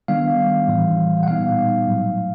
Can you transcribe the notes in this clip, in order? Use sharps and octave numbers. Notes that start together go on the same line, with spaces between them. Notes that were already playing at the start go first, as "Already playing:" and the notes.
D#3 G3 B3 D4 F5
A2 E3 G3
F#5
A#2 G3 B3 D#4 F5
A2 F#3 A3